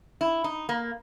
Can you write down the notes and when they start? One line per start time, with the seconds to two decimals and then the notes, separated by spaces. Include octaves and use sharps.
0.21 E4
0.44 D#4
0.69 A#3